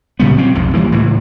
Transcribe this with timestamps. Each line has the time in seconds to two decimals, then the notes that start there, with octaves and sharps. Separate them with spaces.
0.20 A#2 C#3 G3 B3
0.37 F#3 C4
0.55 B1 F2 G#2
0.74 E3 G3 A#3
0.92 C#2 A2 E3